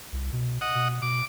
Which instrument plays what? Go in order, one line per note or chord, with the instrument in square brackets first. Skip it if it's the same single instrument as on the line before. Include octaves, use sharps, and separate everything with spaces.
[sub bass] C2
B2
[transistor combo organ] D#5 F#5
[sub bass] B2
[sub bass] B2 [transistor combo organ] D6